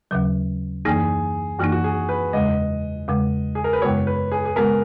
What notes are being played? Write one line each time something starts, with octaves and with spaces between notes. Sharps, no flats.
D#2 C#3 F#3
F#2 E3 A#3 D#4 G#4
F#2 E3 A#3 D#4 F#4
F#4
G#4
B4
E2 C#3 G#3 D#5
E2 C#3 G#3
G#4
A#4
B4
F#2 C#3 G#3 B3 F#4 C#5
B4
G#4
G#4
C#3 G#3 B3 F#4 A#4